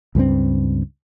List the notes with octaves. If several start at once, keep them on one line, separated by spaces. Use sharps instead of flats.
C#2 G2 G3 C4